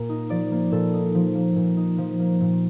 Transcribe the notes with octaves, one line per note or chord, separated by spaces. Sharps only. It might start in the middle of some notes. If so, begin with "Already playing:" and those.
Already playing: A#2 A#3 A#4
D#4
F3 D5
A#3
A#2 A4
D#4
F3
A#3
A#2
D#4
F3
A#3
A#2